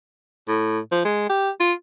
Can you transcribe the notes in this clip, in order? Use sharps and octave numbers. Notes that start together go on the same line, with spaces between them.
A2
F3
G#3
G4
F4